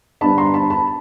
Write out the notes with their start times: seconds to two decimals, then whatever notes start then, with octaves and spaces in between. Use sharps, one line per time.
0.21 G2 D3 G3 B3 D4 A5 B5
0.37 A#5 C6
0.54 A5 B5
0.70 A5 B5